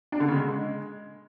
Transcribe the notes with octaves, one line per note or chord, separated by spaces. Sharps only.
D4
D3
C#3
G#3